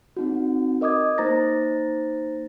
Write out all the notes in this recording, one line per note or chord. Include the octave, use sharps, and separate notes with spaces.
C4 D#4 F#4
A#4 D#5 D6 D#6 G#6
A#3 D#4 C5 A#5 A6 A#6